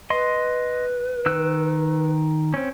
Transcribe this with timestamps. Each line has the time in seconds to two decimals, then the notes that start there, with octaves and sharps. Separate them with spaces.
0.10 B4 D#5 C6
1.26 D#3 E6 F#6
2.54 C4 C#4